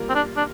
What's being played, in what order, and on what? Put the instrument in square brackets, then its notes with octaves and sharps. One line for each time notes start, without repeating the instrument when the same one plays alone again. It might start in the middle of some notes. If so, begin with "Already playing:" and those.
Already playing: [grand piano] G3 A#3 F4 A#4
[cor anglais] C4
D4
D4